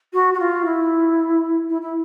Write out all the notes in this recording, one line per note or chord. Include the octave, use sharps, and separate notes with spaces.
F#4
F#4
F4
E4
E4
E4